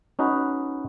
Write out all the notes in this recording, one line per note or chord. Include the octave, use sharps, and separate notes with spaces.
C#4 D#4 F#4 B4 D#5